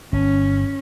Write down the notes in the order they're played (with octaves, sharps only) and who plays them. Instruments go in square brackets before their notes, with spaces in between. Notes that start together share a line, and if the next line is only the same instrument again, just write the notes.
[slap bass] G1 [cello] C#4